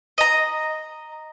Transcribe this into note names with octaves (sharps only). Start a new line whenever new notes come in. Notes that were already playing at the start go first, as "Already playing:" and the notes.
D#5 A#5